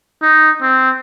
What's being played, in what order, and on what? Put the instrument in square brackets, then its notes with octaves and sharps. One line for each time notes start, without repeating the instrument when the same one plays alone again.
[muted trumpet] D#4
C4